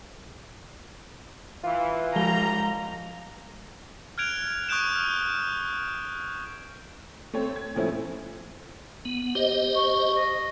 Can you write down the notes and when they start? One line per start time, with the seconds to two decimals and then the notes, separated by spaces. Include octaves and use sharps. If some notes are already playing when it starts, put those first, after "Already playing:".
1.64 E3 F4
2.16 G#2 C#3 F3 G3 G#3 A#5 G7
4.18 F6 F#6 G#6 D7 F7
4.69 C#6 D#6 F#6 G6 D7 E7
4.96 F6
7.33 A3 C4 C#5
7.56 G#6
7.75 A#2 F3 A3 C#4 E4
9.05 B3
9.35 G4 C5 D#5
9.75 C#6
10.15 D#5